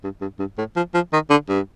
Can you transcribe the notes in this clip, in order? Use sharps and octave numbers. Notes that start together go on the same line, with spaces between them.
G2
G2
G2
A2
F3
F3
D#3
D3
G2